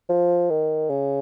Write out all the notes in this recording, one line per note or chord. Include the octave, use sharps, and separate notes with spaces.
F3
D#3
C#3